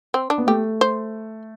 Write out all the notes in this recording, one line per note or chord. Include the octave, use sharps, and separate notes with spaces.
C4
D4
B3
A3 G4
C5